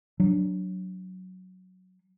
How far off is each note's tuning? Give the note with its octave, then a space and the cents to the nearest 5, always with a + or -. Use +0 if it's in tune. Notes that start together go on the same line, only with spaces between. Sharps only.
F#3 +0 D4 +0